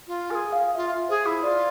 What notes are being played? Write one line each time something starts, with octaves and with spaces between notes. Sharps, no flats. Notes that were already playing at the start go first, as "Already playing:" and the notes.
F4
G#4 A#4 G#5
F5
F4 E5
G#4 C5
E4
F4 D5